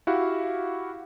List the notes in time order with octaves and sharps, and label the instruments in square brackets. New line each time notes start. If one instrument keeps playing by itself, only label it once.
[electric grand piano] E4 F#4 G4 F5 F#5